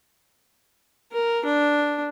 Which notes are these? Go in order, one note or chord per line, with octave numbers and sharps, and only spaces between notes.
A#4
D4